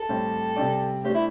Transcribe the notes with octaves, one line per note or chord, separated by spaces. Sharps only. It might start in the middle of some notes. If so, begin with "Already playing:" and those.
Already playing: A4
A2 G3 C4 G4 C5
C3 G3 C4 G4 D5
A3 D4 G4 C5
E4